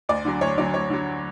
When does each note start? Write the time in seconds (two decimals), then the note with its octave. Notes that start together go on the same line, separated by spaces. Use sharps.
0.09 D2 D5
0.25 D3 F#3
0.41 D2 C#5
0.58 D3 F#3 D5
0.74 D2 C#5
0.90 D3 F#3